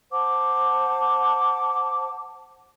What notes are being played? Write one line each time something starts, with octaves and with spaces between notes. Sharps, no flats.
C5 F#5 A5 D6